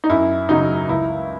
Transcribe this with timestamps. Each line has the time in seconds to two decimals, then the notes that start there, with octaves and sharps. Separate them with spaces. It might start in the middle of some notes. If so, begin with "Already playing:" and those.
0.04 D#4
0.10 F#2 E4
0.49 C#3 F#3 D#4
0.89 C#2 E4